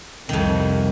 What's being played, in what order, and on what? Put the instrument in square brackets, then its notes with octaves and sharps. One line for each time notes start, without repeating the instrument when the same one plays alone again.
[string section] C2 [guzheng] F2 D#3